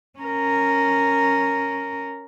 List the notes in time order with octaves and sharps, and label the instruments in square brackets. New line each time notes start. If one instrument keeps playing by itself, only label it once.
[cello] C#4 A#4